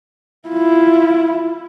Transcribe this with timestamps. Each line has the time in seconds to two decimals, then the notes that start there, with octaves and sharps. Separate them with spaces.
0.48 E4 F4